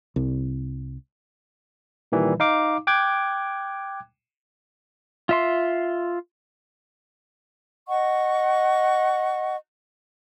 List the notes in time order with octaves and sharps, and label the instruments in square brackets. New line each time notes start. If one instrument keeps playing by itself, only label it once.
[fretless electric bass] C2
[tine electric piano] A#2 D#3 E3 G3
D#4 F5 D6
G5 D6 F#6 G#6
[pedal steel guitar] F4 E5 C6
[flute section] D#5 F#5 C#6